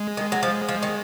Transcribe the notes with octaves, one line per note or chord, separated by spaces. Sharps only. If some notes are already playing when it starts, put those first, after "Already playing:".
Already playing: G#3
D#3
F#3
F3
F3
D#3